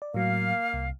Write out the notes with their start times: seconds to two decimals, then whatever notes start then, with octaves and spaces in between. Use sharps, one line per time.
0.02 D5
0.14 A2 F#3 A#3 F5
0.73 C2